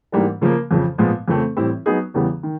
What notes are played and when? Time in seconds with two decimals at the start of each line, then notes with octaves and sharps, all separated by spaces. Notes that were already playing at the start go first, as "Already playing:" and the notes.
0.12 G#2 E3 G3 A#3 D4
0.41 C#3 F3 A#3
0.71 F2 C#3 F3
0.98 A#2 F3 G#3 B3
1.28 F2 C#3 F3 A3 C4
1.57 A2 E3 G3 C4 E4
1.86 F#3 B3 D#4 G#4
2.14 E2 C#3 E3 G3 B3
2.43 D#3